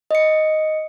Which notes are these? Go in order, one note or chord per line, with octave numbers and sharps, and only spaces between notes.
D#5 C#7